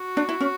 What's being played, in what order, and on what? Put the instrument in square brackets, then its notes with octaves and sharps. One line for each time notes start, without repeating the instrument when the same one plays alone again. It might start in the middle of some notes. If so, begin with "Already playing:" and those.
Already playing: [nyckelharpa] F#4
[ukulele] D4
E4
C#4